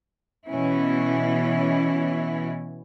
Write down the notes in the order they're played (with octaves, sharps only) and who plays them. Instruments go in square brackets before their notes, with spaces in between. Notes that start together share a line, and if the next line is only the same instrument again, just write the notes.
[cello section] B2 E3 C#4 E4